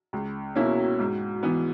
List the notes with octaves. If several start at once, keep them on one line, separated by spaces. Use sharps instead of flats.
C#2
B2 A#3 C#4 E4
G#2
E3 B3